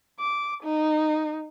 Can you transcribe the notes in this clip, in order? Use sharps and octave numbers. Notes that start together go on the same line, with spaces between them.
D6
D#4